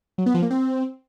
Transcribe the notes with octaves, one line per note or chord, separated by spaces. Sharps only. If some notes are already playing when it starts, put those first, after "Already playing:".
F#3
B3
F3
A#3
C4